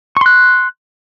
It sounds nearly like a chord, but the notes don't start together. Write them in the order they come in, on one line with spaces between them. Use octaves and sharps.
C#6 C6 F#6